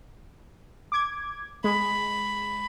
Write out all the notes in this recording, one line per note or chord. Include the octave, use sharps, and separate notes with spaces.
D6 G#6
G#3 B5